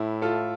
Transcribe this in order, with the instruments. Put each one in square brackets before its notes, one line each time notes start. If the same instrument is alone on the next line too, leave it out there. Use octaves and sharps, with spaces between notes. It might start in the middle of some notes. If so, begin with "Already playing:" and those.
Already playing: [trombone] A2 [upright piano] E4
[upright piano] F4 A4